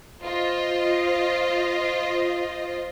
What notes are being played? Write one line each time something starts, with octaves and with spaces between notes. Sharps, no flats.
F4 C5 D#5